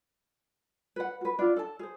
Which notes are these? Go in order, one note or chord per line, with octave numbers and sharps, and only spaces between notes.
B4 F#5
F#4 B4
D4 F4
A4 A5
G#4 C5